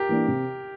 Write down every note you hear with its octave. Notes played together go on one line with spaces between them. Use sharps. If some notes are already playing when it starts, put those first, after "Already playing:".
Already playing: G4 A#4
E3 A#3 D4
C3